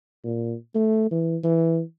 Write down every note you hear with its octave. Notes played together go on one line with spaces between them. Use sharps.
A#2
A3
E3
E3